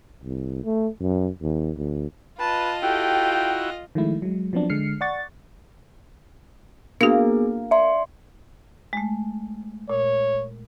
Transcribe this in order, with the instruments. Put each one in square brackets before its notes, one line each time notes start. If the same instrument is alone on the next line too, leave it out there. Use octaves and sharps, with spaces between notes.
[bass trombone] C2
A3
F#2
D#2
D2
[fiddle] F4 D#5 [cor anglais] B4 [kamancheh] A5
[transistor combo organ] E4 F#4 [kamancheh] G4 A4 [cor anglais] G5
[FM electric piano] D#3 F3 G#3 A3 E4
F#3 G#3
F3 F#3 B3 C4 D4
D3 G#3 F6 C7 C#7
D5 F#5 C#6 A6
[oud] A#3 [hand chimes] B3 G#4 [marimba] D4 F#4
[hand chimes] D5 C6 [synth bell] E5
[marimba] G#3 A3
[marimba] A#2 [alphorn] C#5